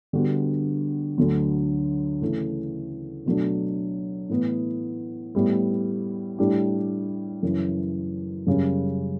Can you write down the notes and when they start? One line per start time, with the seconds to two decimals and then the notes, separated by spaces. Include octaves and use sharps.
0.13 D3 G3 B3 F#4
1.18 D2 D3 F#3
2.21 C#3 E3 A3
3.26 B2 F#3 A3 D4
4.29 A2 E3 B3
5.35 A2 G3 B3 E4
6.38 A2 G3 D4 G4
7.43 F#2 C#3 E3
8.47 F#2 C#3 G3 C#4